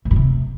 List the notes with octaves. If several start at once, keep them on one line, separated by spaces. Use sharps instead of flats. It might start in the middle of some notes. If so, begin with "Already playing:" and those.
A2
G2
C3